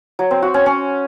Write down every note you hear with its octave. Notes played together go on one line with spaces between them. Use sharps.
F#3
C4
F#4
C#4
C#4